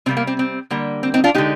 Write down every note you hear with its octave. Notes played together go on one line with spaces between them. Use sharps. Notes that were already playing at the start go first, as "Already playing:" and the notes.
C3 G3 A#3 C4
A#3
C4
C4
D3 G3 A#3
C4
C4 D#4
D4 F4
D3 G#3 D#4 G4